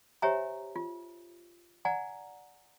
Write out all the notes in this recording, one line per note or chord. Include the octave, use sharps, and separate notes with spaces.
G4 C5 C#5 E5 G#5 A#5
F4
D5 F#5 G#5 A#5